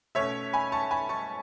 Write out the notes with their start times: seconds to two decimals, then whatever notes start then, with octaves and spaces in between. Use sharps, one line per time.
0.15 B2 A3 C#4 C#5 E5
0.53 G#5 B5
0.72 A5 C#6
0.91 G#5 B5
1.09 A5 C#6